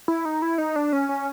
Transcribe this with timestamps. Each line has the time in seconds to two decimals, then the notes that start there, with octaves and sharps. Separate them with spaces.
0.08 E4
0.25 D#4
0.42 E4
0.58 D#4
0.76 D4
0.93 C#4
1.09 C#4